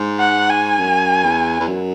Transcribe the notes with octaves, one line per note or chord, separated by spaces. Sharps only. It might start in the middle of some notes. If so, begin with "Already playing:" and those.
Already playing: G#2
F#5
G#5
F#2
E2
E2
F#2